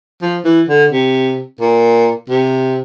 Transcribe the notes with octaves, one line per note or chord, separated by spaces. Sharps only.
F3
E3
D3
C3
A#2
C3